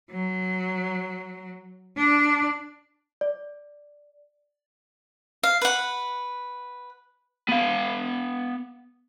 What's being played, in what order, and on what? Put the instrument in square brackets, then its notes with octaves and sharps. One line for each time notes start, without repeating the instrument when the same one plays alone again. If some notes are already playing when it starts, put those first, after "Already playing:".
[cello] F#3
D4
[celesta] D5
[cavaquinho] F5
B4 F#5
[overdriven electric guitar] B3 F5